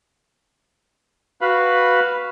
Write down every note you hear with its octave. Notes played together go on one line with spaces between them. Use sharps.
F#4 B4 F5 B5